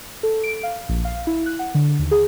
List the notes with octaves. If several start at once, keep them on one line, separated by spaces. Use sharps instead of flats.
A4
D7
F5
A#1
F5
E4
F#6
F#5
D3
D#2
G#4